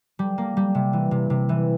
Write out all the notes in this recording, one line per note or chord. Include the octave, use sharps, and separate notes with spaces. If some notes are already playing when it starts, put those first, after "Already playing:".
G3
A#3
G3
C3
E3
C3
C3
E3